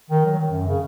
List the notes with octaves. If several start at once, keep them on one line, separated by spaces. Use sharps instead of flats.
D#3
F#3
D#3
F#2
C#3